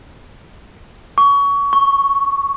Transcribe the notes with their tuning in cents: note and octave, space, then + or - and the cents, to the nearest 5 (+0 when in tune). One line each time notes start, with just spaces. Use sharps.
C#6 +25
C#6 -5